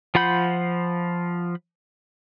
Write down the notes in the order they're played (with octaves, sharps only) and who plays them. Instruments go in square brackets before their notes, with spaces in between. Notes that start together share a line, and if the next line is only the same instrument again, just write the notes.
[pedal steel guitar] F3 F4 F#5 B5 G6